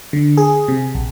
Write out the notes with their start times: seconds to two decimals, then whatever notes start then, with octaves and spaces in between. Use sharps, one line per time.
0.13 D3
0.37 G#4
0.68 C3
0.95 A#1